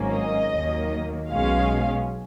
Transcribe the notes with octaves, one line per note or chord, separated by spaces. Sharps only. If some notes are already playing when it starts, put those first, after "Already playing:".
Already playing: G#1 G#2 F#3 A#3 C#4
D#5
D#2 D#3 F#3 A#3
B1 B2 G#3 C#4 F5